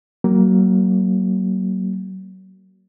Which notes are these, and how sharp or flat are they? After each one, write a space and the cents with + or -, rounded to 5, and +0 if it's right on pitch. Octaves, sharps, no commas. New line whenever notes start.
F#3 +30 A#3 +0